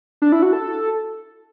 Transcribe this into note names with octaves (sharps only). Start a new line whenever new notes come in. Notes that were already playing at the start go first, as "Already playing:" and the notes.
D4
E4
F#4
A4